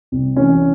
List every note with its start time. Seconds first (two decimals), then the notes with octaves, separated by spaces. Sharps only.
0.12 C2
0.36 E3 C#4